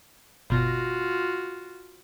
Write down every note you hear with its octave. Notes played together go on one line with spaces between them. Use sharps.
G1 B2 F4 F#4 A#6